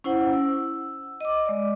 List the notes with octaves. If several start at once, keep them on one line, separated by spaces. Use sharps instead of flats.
C#4 E4 C5 F#5
E6
D#5 D6
G#3 D5